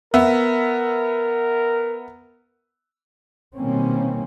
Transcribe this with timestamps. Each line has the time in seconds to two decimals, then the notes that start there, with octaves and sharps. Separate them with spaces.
0.14 B3 A#4 E5
3.55 B2 D#3 G3 A#3 C4 C#4